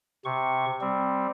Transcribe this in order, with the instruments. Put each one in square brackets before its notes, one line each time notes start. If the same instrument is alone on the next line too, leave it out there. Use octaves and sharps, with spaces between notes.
[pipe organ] C3 C#6
G3 C4